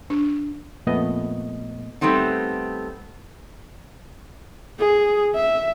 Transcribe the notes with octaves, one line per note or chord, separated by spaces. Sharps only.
D4
F2 A#2 A3 B3 D#5
G3 A3 B3 C4 D#4
G#4
E5